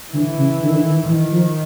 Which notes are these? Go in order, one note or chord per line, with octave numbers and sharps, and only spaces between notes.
D3 E3
C#3
D3
D#3
D3
D#3
D#3 E3
F3